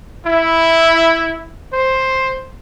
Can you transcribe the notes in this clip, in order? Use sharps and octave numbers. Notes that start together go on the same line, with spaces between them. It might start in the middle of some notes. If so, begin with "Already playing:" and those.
E4
C5